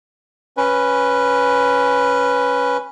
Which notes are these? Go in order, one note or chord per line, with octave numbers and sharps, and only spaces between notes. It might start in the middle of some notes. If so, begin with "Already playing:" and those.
C#4 B4